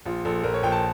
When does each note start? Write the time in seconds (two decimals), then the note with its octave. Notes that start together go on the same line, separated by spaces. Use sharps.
0.06 A#1 F4
0.25 A#1 A4
0.44 A#1 A#4
0.54 C#5
0.63 A#1 G5
0.72 A5